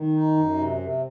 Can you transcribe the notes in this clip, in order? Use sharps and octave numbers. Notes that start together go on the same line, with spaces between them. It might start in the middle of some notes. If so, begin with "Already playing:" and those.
Already playing: D#3
D#4
F#2
C3
C3